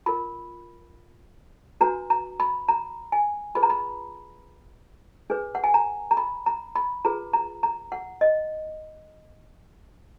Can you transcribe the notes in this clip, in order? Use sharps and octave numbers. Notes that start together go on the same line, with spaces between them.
F4 A#4 B5
D4 F#4 B4 A#5
A#5
B5
A#5
G#5
F4 G#4 B4 B5
A#5
B5
D4 G#4 B4
F#5
G#5
A#5
A#5
B5
A#5
B5
F4 G#4 B4 A#5
A#5
A#5
F#5
D#5